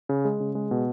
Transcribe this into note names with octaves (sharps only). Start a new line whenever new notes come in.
C#3
G#3
C#3
G#3
B2